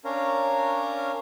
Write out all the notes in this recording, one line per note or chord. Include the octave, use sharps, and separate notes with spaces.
C#4 D4 A#4 C#5 F5 A#5